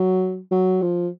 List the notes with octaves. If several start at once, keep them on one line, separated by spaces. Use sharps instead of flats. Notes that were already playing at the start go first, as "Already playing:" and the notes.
Already playing: F#3
F#3
F3